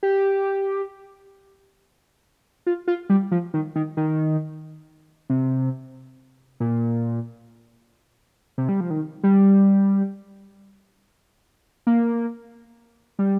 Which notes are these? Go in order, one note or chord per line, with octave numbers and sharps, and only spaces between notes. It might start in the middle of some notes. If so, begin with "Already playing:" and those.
G4
F4
F4
G3
F3
D#3
D#3
D#3
C3
A#2
C3
G3
F3
D#3
G3
A#3
G3